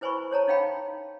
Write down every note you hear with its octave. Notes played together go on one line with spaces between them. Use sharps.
E4 B4 C5 G#5 B5 C#6
C5 C#5 A5 A#5
D#4 C#5 F5 G5 B5